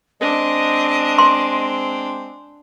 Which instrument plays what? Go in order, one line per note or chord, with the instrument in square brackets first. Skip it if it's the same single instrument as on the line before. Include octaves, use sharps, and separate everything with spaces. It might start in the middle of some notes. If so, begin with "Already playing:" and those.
[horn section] G#3 C4 [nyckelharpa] D4 [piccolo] D#5
[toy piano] C6